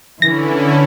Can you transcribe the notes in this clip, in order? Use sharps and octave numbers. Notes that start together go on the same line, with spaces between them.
D3 E3 C#4 E4 A#6